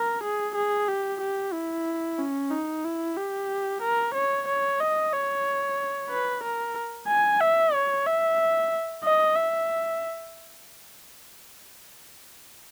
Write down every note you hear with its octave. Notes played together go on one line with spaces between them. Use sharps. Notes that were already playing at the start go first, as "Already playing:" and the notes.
Already playing: A#4
G#4
G#4
G4
G4
E4
C#4
D#4
E4
G4
A#4
C#5
C#5
D#5
C#5
B4
A#4
G#5
E5
C#5
E5
D#5
E5